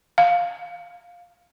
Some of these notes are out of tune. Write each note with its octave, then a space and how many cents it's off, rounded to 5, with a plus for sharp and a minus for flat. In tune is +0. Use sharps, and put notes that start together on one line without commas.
F5 +5